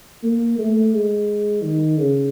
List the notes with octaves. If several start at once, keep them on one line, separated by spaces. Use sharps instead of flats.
A#3
A3
G#3
D#3
C#3